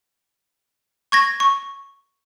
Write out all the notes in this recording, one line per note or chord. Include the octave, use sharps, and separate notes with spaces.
C#6 G#6 A#6
C#6